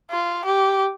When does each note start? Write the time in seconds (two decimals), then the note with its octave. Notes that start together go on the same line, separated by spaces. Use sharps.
0.11 F4
0.45 G4